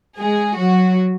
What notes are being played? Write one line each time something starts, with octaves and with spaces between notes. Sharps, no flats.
G#3 G#4
F#3 F#4